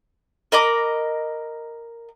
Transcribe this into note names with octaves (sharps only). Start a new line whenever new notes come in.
A#4 D#5 B5 D6